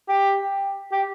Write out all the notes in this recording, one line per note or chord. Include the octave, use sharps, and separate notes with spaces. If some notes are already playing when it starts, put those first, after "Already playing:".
G4
G4